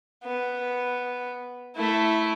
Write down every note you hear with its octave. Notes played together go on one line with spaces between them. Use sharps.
B3
A3 E4